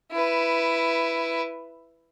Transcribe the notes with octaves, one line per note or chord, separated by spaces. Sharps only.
E4 B4